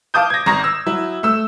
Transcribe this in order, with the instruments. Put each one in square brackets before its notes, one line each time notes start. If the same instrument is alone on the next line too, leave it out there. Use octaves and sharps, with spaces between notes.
[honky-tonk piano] F5 A5 D6 D#6 G6
G#6 A#6
G#1 A#5 C#6 A#6
E6
F#3 E4
A3 E6